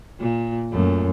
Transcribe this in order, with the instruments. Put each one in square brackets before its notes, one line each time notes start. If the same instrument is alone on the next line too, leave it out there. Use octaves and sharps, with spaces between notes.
[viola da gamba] A#2
[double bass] F#2 [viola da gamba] A#2 A3